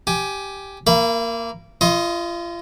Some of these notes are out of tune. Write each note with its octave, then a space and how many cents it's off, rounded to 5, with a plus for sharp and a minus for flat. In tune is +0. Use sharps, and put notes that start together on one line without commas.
G4 +0 G#5 +15
A#3 -5 F5 -45 B5 +0
F4 -35 D#5 +10 C6 +30